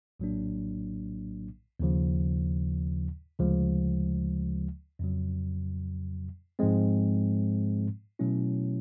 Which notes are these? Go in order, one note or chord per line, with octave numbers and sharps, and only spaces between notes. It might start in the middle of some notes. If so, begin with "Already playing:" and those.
A#1 A2 F#3 A#3 D4
D#2 C#3 F3
D2 C#3 F3 G#3
F2 C#3 F#3
G#2 F3 G#3 C4
B2 F#3 A3 C#4 E4